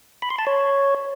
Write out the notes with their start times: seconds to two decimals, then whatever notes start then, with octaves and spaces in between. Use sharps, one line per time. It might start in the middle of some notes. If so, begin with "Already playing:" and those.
0.22 B5
0.30 C6
0.39 A5
0.47 C#5